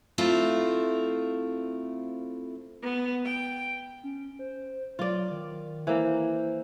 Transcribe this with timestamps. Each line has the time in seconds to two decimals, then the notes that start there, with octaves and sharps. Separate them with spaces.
0.18 A3 C4 E4 F4
2.83 B3
3.25 G5
4.04 C#4
4.39 C5
4.99 F#3 F4 D5
5.31 D#3
5.87 E3 A#3 C5